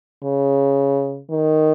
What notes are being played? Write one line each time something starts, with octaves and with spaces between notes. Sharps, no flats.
C#3
D#3